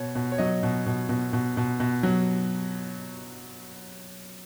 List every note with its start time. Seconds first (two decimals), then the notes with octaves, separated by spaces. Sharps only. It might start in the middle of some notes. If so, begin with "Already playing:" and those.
Already playing: B2 C#5
0.15 B2
0.32 C#5
0.38 F#3 D#5
0.63 B2
0.86 B2
1.09 B2
1.33 B2
1.57 B2
1.80 B2
2.03 F#3